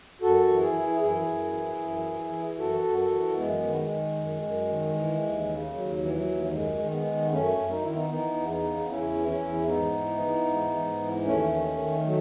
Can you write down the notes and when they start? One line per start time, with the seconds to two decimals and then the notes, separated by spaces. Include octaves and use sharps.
0.21 F#2 F#4 A4
0.48 E3
0.61 E4 G#4
0.75 E3
1.00 F#2 E4 G#4
1.27 F#2
1.53 E3
1.79 F#2
2.06 E3
2.32 E3
2.58 F#2 F#4 A4
2.84 F#2
2.98 F#4 A4
3.11 E3
3.37 F#2 G#3 B3
3.64 D#3
3.76 G#3
3.89 D#3
4.16 F#2
4.43 F#2
4.68 D#3
4.95 E3
5.21 D#2
5.48 C#3
5.73 D#2 F#3
6.00 E3
6.12 F#3
6.26 D#2
6.52 F#2 G#3
6.79 D#3
6.92 G#3 B3
7.05 D#3
7.31 F#2 A3 C#4
7.57 F#2
7.71 D#4
7.82 D#3 E4
7.95 B3 D#4
8.09 E3 B3 D#4
8.36 E2
8.49 B3 D#4
8.63 C#3
8.88 E2 C#4 E4
9.15 E3
9.28 C#4 E4
9.42 E2
9.67 G#2 B3 D#4
9.95 E3
10.20 E3
10.46 G#2
10.72 G#2
10.99 E3
11.25 D#2 A3 C#4
11.52 D#3
11.78 D#3
12.04 F#3 A3